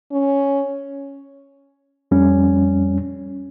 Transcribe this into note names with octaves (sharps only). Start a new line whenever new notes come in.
C#4
F2 G3 C#4